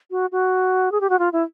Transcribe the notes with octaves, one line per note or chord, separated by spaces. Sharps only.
F#4
F#4
G#4
G4
F#4
F4
E4